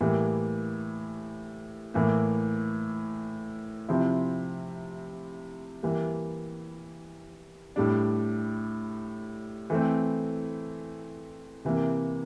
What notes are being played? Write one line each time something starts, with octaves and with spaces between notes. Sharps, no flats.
A2 E3 G3 A#3
A2 E3 A#3
C3 F3 C4 E4
E3 G3 A#3
A2 G3 D4
E3 A3 C4
C3 E3 A#3